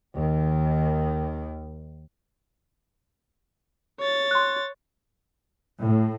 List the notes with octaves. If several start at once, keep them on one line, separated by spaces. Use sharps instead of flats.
D#2 D#3
C#5 A6
C6 F#6
A2